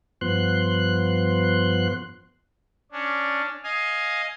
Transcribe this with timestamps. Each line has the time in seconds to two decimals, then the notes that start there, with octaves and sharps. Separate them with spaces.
0.21 G2 F3 B3 C6 F#6
2.92 C#4 D4
3.64 D#5 F5 G#5